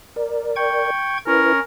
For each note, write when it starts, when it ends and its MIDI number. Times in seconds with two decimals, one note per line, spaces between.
0.16 0.90 70
0.16 0.90 74
0.56 1.18 79
0.56 1.18 85
0.56 1.18 92
1.27 1.60 61
1.27 1.53 64
1.27 1.60 70
1.27 1.53 71